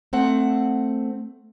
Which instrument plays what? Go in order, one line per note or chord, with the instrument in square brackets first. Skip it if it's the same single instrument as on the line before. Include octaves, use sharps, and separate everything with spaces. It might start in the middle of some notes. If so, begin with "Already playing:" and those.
[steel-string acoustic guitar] A3 C4 F#5